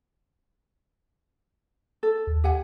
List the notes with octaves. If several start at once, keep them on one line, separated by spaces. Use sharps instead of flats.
A4
D#2
G4 F#5 G#5